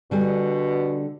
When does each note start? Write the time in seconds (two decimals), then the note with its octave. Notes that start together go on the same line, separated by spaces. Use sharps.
0.11 B2 D3 G3 G#5